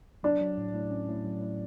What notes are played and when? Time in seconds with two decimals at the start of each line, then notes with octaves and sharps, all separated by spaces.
0.23 F#3 D4
0.41 F#3
0.58 A2
0.74 A2
0.91 C#4
1.08 A2
1.25 F#3
1.42 A2